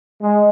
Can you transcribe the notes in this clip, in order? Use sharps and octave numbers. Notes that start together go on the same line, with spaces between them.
G#3